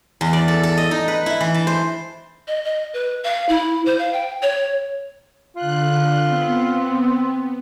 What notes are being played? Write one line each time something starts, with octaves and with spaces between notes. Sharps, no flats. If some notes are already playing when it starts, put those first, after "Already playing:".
E2
D5
A4
A4
D#5
D#4
B4
E4
E3
A5
C5
D#5
D#5
B4
F5
E4
C5
F5
G5
C#5
D3 F4 F#6
B3 C4